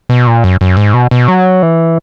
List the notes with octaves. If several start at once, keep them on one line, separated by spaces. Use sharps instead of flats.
B2
A#2
F#2
F#2
G#2
B2
B2
F#3
E3